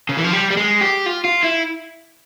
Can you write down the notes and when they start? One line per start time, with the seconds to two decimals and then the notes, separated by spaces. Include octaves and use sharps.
0.09 C#3
0.17 E3
0.24 F3
0.33 G3
0.50 G3
0.57 G#3
0.81 G4
1.06 F4
1.25 F4
1.43 E4